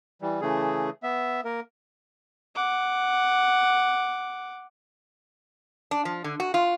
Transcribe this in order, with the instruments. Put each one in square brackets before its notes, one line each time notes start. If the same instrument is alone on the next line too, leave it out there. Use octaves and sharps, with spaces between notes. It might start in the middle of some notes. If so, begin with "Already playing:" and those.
[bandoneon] E3 G3
C#3 E3 A3 G#4
B3 E5
A#3 A#4
[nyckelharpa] F#5 D6
[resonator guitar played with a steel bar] D4
F3
D3
F#4
F4